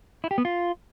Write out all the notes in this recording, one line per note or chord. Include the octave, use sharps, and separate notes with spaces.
E4
G4
B3
F4